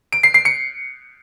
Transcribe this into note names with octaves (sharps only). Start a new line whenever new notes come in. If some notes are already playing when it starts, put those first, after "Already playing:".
D7
C7
C7
C#7